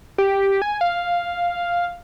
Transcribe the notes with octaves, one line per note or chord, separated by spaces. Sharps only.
G4
G#5
F5